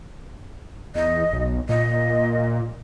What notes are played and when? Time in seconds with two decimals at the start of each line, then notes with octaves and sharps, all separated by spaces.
0.95 E2 D#5
1.33 B1
1.69 A#2 D#5